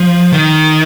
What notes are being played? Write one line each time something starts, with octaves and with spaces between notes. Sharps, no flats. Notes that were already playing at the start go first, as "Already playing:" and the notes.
Already playing: F3
D#3